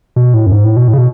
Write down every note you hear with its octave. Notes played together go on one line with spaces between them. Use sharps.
B2
A2
F#2
G#2
A2
B2
A2
C#3
B2